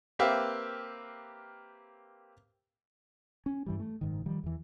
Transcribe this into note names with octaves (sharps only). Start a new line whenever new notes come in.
A#3 C4 G4 B4 E5 F5
C#4
G2 E3 G3
A3
F#1 G#2 D#3
D#3 F3 G3
E2 E3